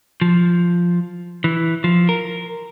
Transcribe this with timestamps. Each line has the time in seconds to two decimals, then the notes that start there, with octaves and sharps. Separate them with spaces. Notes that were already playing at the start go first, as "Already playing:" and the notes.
0.22 F3
1.44 E3
1.84 F3
2.09 A#4